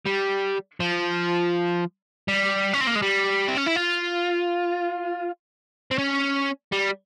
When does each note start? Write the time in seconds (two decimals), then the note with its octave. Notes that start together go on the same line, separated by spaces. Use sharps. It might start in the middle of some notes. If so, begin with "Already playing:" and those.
0.05 G3
0.80 F3
2.28 G3
2.73 C#4
2.81 C4
2.87 A#3
2.95 G#3
3.02 G3
3.48 C4
3.57 C#4
3.67 E4
3.76 F4
5.91 C4
5.98 C#4
6.72 G3